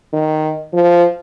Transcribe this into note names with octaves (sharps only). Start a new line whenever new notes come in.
D#3
F3